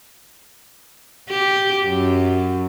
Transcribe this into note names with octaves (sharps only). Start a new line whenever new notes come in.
G4
F#2